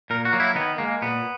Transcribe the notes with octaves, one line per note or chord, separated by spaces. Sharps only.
A#2 A#4
F#4
F#3 A#3
E4
D#3 B3
G#3 A#3
A#2 B3